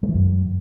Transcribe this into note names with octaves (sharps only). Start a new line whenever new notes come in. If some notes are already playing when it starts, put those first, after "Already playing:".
G#3
E3
F#2